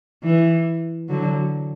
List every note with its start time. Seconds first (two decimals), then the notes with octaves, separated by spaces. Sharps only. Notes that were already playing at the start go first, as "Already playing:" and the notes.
0.23 E3
1.09 D3 F#3